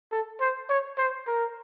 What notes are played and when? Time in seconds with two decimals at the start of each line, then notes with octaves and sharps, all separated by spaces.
0.12 A4
0.40 C5
0.69 C#5
0.98 C5
1.27 A#4